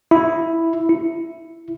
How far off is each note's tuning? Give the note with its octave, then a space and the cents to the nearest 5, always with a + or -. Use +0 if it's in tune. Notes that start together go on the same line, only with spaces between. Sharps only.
E4 +0
E4 +5